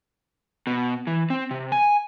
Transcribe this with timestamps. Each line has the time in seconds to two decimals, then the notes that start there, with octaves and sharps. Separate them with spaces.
0.67 B2
1.07 E3
1.30 C4
1.51 C3
1.72 G#5